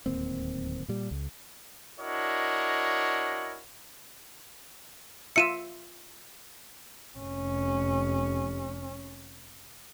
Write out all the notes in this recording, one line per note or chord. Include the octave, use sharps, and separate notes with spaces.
D1 D#2 A#3 C4
A#2 G3
C#2
D4 E4 F#4 A#4 C#5 D#5
F4 E5 E6 C#7 D#7 E7
F1 C#4